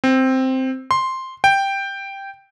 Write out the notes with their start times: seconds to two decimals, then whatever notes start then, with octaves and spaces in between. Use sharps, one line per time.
0.04 C4
0.91 C6
1.44 G5